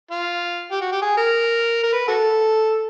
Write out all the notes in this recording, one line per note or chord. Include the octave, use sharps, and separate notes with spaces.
F4
G4
F#4
G4
G#4
A#4
A#4
B4
F#4 A4